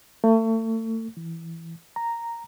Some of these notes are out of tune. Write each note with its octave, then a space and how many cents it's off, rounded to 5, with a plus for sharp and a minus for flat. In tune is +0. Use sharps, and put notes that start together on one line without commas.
A3 +35
E3 +5
A#5 -5